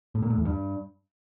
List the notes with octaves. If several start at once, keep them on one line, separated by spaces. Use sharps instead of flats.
A2
A#2
A2
E2
G2